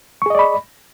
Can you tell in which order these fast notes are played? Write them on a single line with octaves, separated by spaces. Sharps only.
C#6 G#4 D#5 D5 B5